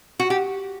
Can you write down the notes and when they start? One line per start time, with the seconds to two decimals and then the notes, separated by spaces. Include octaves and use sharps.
0.19 F#4
0.30 G4